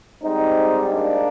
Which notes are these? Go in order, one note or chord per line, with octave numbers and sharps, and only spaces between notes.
G#2 G3 C4 D#4
A#3 D4